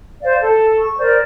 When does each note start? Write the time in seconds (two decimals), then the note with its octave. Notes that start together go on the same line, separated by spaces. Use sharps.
0.22 C5 D5 F5
0.39 A4
0.79 C#6
0.98 A#4 C5 D5